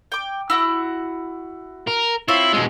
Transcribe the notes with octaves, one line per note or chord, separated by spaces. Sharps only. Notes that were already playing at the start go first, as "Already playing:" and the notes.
G5 D6
E4 F#4 E6
A#4
C4 E4 F4 C#5
B2 G#3